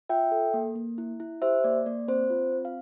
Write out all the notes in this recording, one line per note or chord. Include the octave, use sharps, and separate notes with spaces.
F4 E5 G5
A4
A#3
A#3
E4
E4
G4 C5 E5
A#3 D5
A#3 D5
C4 C5
F4
C4
F5